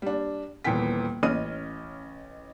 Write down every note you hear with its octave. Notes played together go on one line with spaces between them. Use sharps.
G3 D4
D#1 A#2 E3 B3 G5 B6
A1 C#4 D#5 D#6 F6 D#7